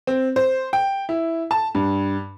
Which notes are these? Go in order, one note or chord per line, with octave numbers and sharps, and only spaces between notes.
C4
C5
G5
E4
A5
G2